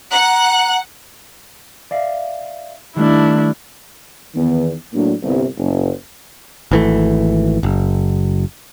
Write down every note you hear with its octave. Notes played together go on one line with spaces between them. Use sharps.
F#5 A#5 F#6
D5 E5 F5
D#3 G3 A3 D4 E4
E2 D#3 B3
A2 F#3 A#3 D4
G1 C2
F#1
G#1 E3 A3
F#1